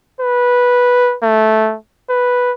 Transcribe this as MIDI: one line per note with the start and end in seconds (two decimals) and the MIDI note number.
0.20 1.15 71
1.22 1.76 57
2.09 2.52 71